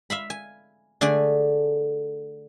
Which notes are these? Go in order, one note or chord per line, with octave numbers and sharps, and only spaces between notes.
E5 F5 B5
G#5
D3 A3 G#4 D5 G#5